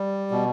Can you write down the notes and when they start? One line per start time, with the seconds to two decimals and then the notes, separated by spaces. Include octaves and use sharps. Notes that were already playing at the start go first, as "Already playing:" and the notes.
Already playing: G3
0.31 B2